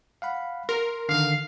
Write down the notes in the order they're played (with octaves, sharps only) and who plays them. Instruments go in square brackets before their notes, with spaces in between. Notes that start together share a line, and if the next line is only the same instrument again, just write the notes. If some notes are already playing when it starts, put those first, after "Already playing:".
[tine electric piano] F5 F#5 B5
[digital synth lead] A#4 [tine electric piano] C6
[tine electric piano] D3 D#3 [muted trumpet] F5